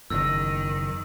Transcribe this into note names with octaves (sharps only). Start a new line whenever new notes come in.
F#1 E2 D#3 E6